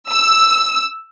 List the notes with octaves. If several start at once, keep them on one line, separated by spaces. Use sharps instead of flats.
E6